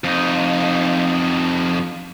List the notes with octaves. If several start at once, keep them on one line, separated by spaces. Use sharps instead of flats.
F2 D#4